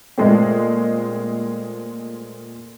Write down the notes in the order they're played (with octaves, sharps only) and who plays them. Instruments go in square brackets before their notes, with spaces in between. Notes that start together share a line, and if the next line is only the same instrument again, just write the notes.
[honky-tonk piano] A#2 G#3 A3 C4